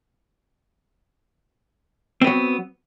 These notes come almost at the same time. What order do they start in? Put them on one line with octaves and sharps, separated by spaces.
C4 B3 F#3